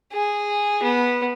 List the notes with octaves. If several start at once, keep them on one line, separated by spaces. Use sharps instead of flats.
G#4
B3